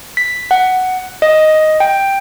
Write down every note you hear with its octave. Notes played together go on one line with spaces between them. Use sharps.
B6
F#5
D#5
G5